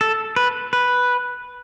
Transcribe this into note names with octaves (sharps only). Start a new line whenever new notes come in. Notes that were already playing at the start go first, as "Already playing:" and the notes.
A4
B4
B4